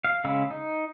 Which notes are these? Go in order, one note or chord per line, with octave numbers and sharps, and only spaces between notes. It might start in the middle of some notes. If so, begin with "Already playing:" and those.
F5
C#3 G#3 F5 B5 E6
D#4